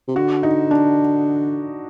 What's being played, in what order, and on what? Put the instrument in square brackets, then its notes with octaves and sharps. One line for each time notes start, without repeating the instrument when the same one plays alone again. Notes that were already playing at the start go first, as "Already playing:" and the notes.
[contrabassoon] C3
[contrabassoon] D3 [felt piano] F#4
[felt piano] D#4
D4